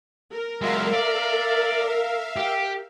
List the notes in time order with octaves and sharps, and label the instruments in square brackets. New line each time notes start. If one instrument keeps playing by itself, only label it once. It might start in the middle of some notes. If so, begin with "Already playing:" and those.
[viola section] A#4
[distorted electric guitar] F#3 G#3 [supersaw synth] E5 F5
[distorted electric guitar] D5
G4